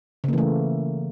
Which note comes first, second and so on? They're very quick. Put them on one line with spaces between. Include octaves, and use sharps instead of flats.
C#3 A#3 E3 A3